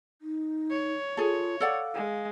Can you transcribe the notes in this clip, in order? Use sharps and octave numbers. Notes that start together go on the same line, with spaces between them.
D#4
C#5
F4 G#4 A4
A4 D5 F5 F#5
G#3